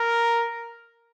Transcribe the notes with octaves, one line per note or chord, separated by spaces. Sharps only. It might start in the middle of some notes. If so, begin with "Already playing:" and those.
Already playing: A#4